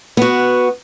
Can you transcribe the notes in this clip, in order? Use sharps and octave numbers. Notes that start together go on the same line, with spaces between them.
B3 F#4